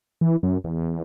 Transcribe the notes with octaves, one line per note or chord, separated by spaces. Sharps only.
E3
F#2
E2